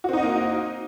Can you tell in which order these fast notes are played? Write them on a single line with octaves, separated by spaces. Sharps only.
F#4 C4 D#4 D#5 A#3